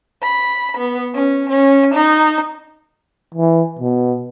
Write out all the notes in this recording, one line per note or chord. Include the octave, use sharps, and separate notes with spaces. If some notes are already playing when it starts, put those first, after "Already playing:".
B5
B3
C#4
C#4
D#4
E3
B2